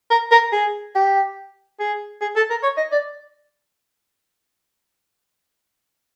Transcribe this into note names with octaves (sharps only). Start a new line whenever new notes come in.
A#4
A#4
G#4
G4
G#4
G#4
A4
A#4
C#5
D#5
D5